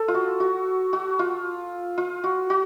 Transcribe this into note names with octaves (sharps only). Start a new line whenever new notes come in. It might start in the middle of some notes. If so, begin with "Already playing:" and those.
Already playing: A4
F4
F#4
F#4
F#4
F4
F4
F#4
F#4